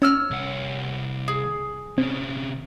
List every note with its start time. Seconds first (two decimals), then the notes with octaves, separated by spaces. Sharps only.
0.02 C#4 C#5 E6 F6
0.31 C2 F#5
1.28 G#4
1.98 C3 C4 C#4